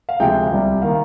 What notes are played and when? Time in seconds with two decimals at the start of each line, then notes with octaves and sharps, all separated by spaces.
0.09 F5
0.20 D2 C3 F3 G#3 G5
0.51 C2 C3 G3
0.82 D#3 A#3 F5